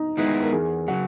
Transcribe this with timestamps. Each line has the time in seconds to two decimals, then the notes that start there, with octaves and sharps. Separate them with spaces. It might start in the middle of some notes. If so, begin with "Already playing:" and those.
Already playing: D#4
0.17 D#3 G#3 B3 D#4 E4
0.42 A#4
0.52 E2 G#4
0.88 C#3 F#3 F#4